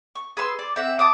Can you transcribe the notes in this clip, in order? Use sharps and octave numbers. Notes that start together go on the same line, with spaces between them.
C#6
G#4 B4 C6 E6
D5
C4 E5 F#5
A5 D6 D#6